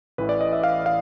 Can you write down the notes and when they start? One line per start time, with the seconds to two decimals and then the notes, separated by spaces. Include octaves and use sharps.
0.18 A1 A2 E3 B4
0.29 D5
0.41 D#5
0.53 E5
0.64 F5
0.86 F5